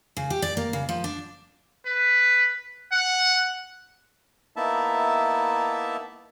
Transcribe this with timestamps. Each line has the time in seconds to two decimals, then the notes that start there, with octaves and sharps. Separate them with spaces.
0.17 C#3
0.30 G4
0.42 D5
0.57 A#3
0.73 C#3
0.89 F3
1.04 D4
1.86 B4
2.92 F#5
4.56 A#3 B3 D#4 E4 E5 A5